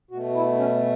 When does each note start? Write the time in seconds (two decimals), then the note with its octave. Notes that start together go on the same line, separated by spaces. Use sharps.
0.11 B2 F#4
0.15 A3
0.35 E4
0.58 C#4